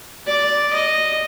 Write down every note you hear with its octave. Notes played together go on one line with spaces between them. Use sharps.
D5
D#5